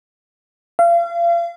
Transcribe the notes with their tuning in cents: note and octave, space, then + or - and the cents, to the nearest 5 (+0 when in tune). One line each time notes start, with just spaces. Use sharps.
F5 -35